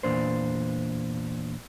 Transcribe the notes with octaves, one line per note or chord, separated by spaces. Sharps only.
E2 A#2 D4 C5